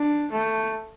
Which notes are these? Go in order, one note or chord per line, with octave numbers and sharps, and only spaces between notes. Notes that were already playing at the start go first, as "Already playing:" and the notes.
Already playing: D4
A3